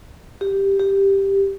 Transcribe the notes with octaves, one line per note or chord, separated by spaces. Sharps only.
G4
G4